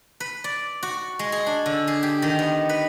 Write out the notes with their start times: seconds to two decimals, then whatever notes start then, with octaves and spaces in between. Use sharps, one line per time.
0.20 B4
0.44 D5
0.83 F#4
1.19 G#3
1.32 G#4
1.47 D4
1.66 D3
1.87 G#4
2.03 G4
2.22 D#3
2.39 B3
2.69 B4